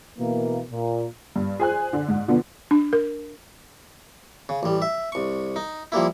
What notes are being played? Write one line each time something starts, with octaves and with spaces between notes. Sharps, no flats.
B2 E3 A#3
A#2
G2
G#4 C5 G#5 F#6
D3
G#2
B2 D3 F3 B3
D4
A#4
C#3
A1 G3
E5
C2 C#6
D#4
F3 G3 A#3 E4